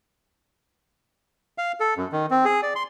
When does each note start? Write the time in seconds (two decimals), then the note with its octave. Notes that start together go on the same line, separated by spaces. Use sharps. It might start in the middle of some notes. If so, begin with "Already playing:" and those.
1.58 F5
1.80 A4
1.97 F#2
2.12 D#3
2.31 C4
2.45 G#4
2.63 D5
2.76 C6